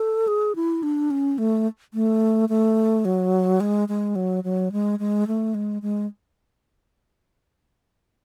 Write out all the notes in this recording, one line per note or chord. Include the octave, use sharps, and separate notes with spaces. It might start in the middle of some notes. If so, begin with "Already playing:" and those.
Already playing: A4
G#4
E4
D4
C#4
A3
A3
A3
F#3
G#3
G#3
F#3
F#3
G#3
G#3
A3
G#3
G#3